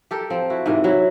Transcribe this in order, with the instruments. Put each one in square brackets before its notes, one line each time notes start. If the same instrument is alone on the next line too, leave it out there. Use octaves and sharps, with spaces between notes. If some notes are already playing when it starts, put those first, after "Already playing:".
[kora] G4 A4 A#4
F3 C4
E4 F#4
G#2 C3 E3 A#4
F#3 E4